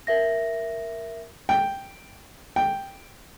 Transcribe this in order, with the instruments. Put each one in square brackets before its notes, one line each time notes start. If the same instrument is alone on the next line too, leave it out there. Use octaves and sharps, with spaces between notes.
[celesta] A#4 E5 A#6
[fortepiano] G5
G5